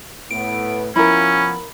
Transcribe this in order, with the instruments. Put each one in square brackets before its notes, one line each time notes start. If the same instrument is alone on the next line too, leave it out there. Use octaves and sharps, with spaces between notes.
[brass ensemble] A2 B3 [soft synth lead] D7
[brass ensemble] F3 B3 F4 [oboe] C#4 [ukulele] E4 A#4 [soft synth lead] B5